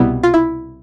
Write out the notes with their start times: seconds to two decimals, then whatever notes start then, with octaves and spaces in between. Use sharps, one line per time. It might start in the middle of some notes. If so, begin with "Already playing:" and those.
Already playing: C2 B2 G3 B3 E4
0.23 F4
0.34 E4